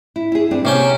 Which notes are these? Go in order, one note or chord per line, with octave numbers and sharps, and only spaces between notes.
E4
E4 G#4
G2 C4 D4
C3 A#3 C#4 G5